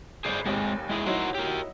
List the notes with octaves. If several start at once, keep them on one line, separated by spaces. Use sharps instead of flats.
G1 G#4 C5 D5 C7
F1 D#2 G#3 C4
G#3 E4 G#4
F#3 D#4 E4 F#4 A#4 C5
G4 A#4